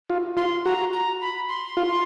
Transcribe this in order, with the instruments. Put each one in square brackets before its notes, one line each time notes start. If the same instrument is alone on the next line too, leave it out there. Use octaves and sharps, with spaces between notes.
[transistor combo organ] F4
[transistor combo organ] F4 [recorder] C6
[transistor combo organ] F#4 [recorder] A#5
[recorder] A#5
B5
C6
[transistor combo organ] F4